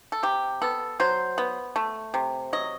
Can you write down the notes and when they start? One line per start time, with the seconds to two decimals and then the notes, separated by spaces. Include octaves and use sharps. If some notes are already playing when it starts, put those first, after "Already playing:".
0.12 A4
0.23 C3 G4
0.62 B3 A4
1.00 F#3 C5
1.38 B3
1.76 A3
2.14 C3
2.53 F#3 D#5